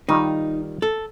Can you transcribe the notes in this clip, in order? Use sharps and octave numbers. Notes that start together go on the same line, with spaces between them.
D#3 G3 D#4 F4
A4